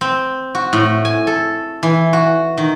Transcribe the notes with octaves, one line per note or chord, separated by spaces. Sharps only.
C4
F#4
A2
G#5
A4
E3
F#4
D#3